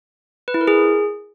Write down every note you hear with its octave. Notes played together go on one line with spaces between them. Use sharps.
B4
E4
A#4
G#4